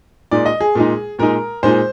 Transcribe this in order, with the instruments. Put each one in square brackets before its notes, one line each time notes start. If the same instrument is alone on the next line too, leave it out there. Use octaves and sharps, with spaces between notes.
[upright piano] A#2 G#3 D#4 D5
D#5
G#4
A#2 G#3 D#4
A#2 G#3 D#4 A#4
A#2 G#3 D#4 C5